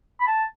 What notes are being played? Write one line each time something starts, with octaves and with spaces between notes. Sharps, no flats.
B5
A5